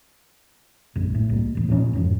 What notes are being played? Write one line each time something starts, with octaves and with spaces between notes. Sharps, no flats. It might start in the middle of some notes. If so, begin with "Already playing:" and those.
A#1 F#2
A2
C2 A#3
A1 E2
A#2 F3 G3 C#4
F2 G#2 F3